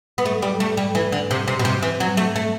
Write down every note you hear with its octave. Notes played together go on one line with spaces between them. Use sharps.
B3
A3
G3
A3
G3
E3
D3
C3
C3
B2
C3
E3
F#3
A3
A3